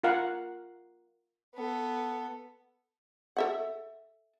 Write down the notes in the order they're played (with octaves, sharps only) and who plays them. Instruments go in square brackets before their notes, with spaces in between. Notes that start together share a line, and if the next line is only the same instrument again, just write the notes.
[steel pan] F4 A#4 F5 F#5
[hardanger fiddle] B3 A4
[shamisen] A4 E5 F#5